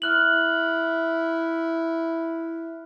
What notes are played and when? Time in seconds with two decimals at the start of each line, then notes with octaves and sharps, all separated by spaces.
0.02 E4 F6 F#6 F#7